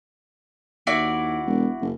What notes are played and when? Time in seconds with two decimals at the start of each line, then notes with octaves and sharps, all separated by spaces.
0.87 D#2 E4 F#4 D5
1.46 E1
1.81 F#1